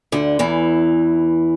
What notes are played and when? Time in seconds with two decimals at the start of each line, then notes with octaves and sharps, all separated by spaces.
0.12 D2 D3
0.39 E2 E3